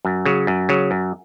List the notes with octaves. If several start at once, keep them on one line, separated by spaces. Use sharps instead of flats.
F#2
C#3 F#3
F#2
C#3 F#3
F#2